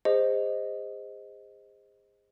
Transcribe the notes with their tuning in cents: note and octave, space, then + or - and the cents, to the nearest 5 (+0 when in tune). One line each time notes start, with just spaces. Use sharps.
G#4 -35 C5 +0 D#5 +0